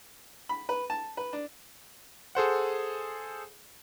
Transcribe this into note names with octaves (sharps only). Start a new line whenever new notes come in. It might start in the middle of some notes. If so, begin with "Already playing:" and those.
B5
B4
A5
B4
D4
G#4 A4 C5 F#5